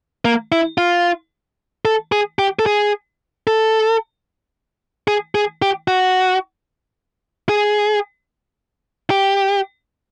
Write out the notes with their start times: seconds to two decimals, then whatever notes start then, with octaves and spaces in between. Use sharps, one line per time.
0.25 A#3
0.52 E4
0.78 F4
1.85 A4
2.12 G#4
2.39 G4
2.59 A4
2.66 G#4
3.47 A4
5.08 G#4
5.35 G#4
5.62 G4
5.88 F#4
7.49 G#4
9.10 G4